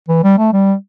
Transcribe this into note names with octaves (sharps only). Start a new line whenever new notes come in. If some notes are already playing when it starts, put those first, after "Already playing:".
E3
G3
A3
G3